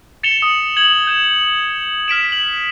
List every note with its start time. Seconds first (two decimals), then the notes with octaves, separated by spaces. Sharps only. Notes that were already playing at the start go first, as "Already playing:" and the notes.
0.23 A6 C#7 E7 F7 G7
0.42 D#6
0.77 G#6 F#7
1.07 G6 E7
2.08 F6 B6 D7 E7
2.32 F#7